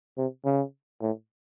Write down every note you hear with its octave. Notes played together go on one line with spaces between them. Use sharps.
C3
C#3
A2